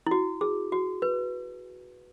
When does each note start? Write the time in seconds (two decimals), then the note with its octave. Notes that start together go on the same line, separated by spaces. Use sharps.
0.07 E4
0.11 F#4
0.41 G#4
0.72 F#4
1.02 B4